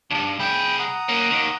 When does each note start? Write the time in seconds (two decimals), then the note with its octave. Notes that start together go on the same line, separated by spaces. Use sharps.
0.10 D2 G2 D4
0.39 C2 G#4 G5 B5
0.79 F#5 A#5 D#6
1.09 A#3 C#4
1.30 D#2 D#3